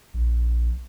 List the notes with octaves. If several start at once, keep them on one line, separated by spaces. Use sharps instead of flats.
A#1